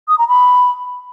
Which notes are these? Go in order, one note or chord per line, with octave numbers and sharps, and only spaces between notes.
D#6
A#5
B5